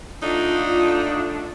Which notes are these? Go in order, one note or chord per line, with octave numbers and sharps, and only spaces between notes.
D3 A3 D4 D#4 F4